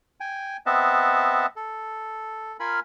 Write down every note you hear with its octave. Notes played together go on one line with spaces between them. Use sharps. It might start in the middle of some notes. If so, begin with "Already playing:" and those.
G5 G#5
B3 C4 D#5 E5 F#5 A5
A4
F4 A#4 G#5 B5